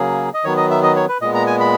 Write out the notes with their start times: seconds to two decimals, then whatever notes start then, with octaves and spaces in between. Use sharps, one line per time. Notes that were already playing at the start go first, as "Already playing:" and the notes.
Already playing: C#3 F#3 A#3 G#4
0.34 D#5
0.44 D#3 F#3 B3 C#5
0.57 D#5
0.71 E5
0.83 D#5
0.96 C#5
1.09 B4
1.21 A#2 G#3 B3 D#5
1.34 A#5
1.47 G#5
1.60 B5